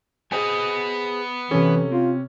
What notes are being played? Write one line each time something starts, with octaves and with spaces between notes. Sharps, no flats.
B3 G#4 C5 D#5 G#5
C3 E3 C#4 A4
C4 F4